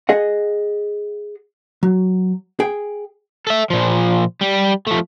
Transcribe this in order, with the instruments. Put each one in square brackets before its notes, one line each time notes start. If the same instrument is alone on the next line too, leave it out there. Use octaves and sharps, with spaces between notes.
[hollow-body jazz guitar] G#4 D#5 F#5
F#3
G#4 G5
[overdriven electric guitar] A4 E5
A#2 F3
G3
F3 A3